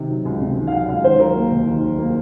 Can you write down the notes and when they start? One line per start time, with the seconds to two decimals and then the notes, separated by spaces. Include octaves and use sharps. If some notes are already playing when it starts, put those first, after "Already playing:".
Already playing: C3 D#3
0.09 F#3
0.25 C#2
0.41 C3
0.57 D#3
0.67 F5
0.72 F#3 F#5
0.88 C#2 F5
1.04 D#3 C5
1.20 F#3 A#4
1.36 A#3
1.52 D#2
1.67 D#3
1.83 F#3
1.99 A#3